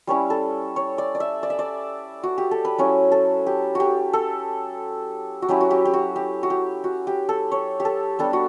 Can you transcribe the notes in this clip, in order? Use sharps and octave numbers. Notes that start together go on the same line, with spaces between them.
G3 C#4 E4 C#5
A4
C#5
D5
D5
E5
D5
E5
D5
F#4
G4
A4
B4
F#3 C#4 E4 C#5
A4
G4
F#4 G4
A4
F#4
F#3 C#4 E4 G4
F#4
G4
G4
F#4
G4
F#4
G4
F#4
G4
A4
C#5
G4
A4
G3 B3 D4 A4
F#4